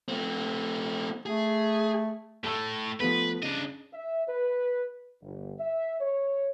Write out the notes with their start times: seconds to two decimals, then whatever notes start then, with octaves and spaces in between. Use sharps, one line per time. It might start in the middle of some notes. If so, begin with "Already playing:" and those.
0.08 A3 C4
1.26 A3 G#4
2.44 A2 A3 A4 E6
3.00 F3 A3 B3 B4
3.43 C#3 D4 D#5
3.93 E5
4.28 B4
5.22 G1
5.59 E5
6.00 C#5